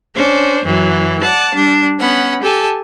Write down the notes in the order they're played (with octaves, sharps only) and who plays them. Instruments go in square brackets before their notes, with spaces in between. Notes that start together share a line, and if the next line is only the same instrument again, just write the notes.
[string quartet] C#4 D4 C5
F#2 E3 F#3
D5 F#5 A5
G3 D4
B3 C#4 F#5 B5
G4 A4 G#5 A5